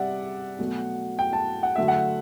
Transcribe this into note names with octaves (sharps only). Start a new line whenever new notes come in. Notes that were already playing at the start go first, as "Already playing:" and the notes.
Already playing: C3 G3 D5 E5 F#5
B2 F#3 A3
G5
A5
F#5
D3 F#3 A3 E5
F#5